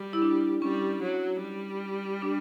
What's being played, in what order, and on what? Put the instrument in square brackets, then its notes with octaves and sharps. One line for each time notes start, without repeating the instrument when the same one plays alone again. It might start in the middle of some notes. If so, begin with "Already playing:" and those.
Already playing: [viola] G3
[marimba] E4
D4
[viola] G3 [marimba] C#4
[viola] F#3
G3
[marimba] D4